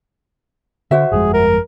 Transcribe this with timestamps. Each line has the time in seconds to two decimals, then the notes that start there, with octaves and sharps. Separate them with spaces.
0.91 D3 F#4 C5 E5
1.12 G1 F2 G#3 G#4
1.33 A#4